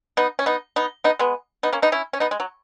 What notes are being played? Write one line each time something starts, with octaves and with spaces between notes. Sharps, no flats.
B3 D#4
C#4
B3 D#4
B3 D#4
B3 D#4
G#3 B3
B3 D#4
A#3 C#4
B3 D#4
C#4 E4
C#4
B3 D#4
G#3
F#3